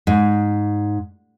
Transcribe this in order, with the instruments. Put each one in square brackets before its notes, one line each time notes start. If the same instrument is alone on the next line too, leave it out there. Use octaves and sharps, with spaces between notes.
[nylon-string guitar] G#2